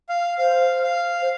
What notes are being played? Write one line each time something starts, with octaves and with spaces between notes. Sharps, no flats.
F5
C5 F5
F5
C5